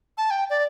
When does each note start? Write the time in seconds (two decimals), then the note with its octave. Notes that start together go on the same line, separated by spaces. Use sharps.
0.18 A5
0.31 G5
0.50 D5